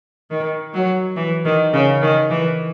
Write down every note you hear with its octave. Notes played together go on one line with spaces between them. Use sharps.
D#3
F#3
E3
D#3
C#3
D#3
E3